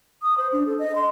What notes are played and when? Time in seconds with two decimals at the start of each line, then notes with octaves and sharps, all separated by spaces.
0.22 D#6
0.38 C5
0.53 D4
0.66 A4
0.79 D#5
0.95 C6